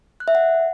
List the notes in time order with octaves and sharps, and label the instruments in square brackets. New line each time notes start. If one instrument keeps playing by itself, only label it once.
[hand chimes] F#6
E5
F#5